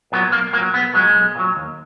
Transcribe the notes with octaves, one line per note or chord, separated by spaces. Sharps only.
A#2 F#3 B3
B1 A#3
A#2 F#3 A#3
B1 B3
A#2 F#3 G#3
B1
A#2 F#3
D#2